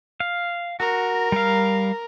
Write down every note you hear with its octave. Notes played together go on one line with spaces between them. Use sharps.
F5
F#4 A#4
G3 F5